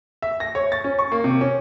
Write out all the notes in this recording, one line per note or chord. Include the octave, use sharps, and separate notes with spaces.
E5
A#6
C#5
A6
C#4
C#6
A#3
C3
C#4